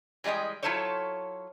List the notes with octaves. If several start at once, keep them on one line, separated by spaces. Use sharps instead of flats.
E3 G3 G#3 D#5 G5
F#3 E4 F4 A4 C5 C#5